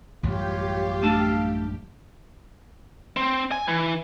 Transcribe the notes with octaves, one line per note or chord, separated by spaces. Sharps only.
A1 F#2 G3 F4 G4 C#5 F5
A3 D4 F5 A5
C4
G#5
E3